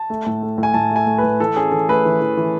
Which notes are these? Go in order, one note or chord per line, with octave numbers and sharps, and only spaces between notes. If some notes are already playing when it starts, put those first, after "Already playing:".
Already playing: A5
A3
A2
A3
A2
G#5
A2 A5
A3 G#5
A3
A2 B4
E3 A4
C#4 G#4
E3 A4
A3 B4
E3
E3
E3